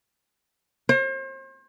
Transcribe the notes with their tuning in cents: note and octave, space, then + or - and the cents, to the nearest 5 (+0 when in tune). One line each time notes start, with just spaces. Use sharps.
C5 +40